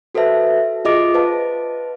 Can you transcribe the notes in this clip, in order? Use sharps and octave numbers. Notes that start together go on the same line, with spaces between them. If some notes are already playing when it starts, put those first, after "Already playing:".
F#4 A4 B4 C5 E5 A5
F4 G#4 D#5 D6 A#6 D7
B4 C5 F5 A5